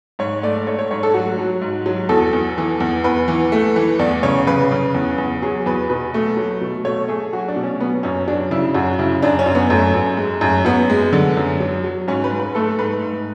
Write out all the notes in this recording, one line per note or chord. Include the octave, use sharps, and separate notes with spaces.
G#2 C#5
A3 D5
A3 C#5
C#5
G#2 C#5
A4
F#3 F#4
F#3
G#2
F#3
E2 A4
E2
E3
E2
E2 B4
E3
A3
E3
E2 D5
C#3 C#5
C#3 B4
C#3
E2
E2
F#3 G#4
E2 B4
B2 B4
A3
F#3
B2
A3 C#5
A3 G#4
F#3 F#4
D4
B2
C#4
F#3 B3
F#2 C#4
F#3 D4
C#3 E4
F#2 F#4
C#3 E4
F#2 D4
C#4
F#2
B3
F#2 A3
F#2
G#3
F#2
F#2 B3
G#3
D3
F#2
F#3
F#3
G#2 C#4
B4
G#2
B4
A3 A4
G#2 B4
G#2